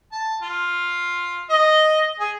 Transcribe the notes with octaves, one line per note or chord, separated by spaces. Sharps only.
A5
F4
D#5
G#4